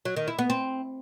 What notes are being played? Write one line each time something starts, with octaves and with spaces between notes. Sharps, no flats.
F#3
D#3
E4
B3
C4